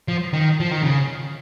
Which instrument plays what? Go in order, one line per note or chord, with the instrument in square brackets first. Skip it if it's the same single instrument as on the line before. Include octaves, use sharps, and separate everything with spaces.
[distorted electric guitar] F3
D#3
F3
D#3
C#3